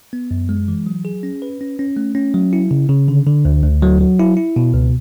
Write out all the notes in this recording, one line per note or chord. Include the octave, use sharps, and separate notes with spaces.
B3
F#2
G#3
E3
F#3
G#4
C#4
B4
C#4
C#4
A3
C#4
F#3
E4
C#3
C#3
D3
D3
D2
D2
F#3
F#3
E4
E4
B2
C#2